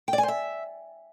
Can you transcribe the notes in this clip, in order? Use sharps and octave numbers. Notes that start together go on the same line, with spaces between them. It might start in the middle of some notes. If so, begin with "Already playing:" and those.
G5
D5
G#5
C5
E5